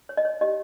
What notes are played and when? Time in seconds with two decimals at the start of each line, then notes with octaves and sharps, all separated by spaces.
0.09 C#5
0.17 D#5
0.25 C#5
0.41 G4 D#5